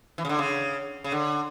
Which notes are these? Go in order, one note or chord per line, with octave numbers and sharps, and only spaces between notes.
E3
C#3
D3
C#3
C#3
D3